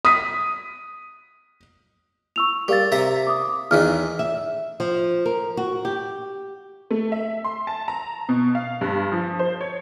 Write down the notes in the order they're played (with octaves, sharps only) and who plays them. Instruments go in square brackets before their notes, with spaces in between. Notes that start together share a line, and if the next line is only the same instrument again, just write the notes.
[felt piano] D#6 B6
[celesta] C#6 E6 F7
[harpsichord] G3 [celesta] A#4 F5 A6
[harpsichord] C3 E5 A#5
[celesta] D6 D#6
[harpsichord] E2 D#3 E3 [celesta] F6
[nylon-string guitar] E5
F3
A#4
F#4
G4
[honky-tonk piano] A3
E5
C6
A5
A#5
B2
F5
G2
F3
C5
C#5